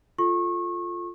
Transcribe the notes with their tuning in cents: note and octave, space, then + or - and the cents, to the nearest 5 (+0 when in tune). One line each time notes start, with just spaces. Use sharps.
F4 +0 A4 +0 C#6 -30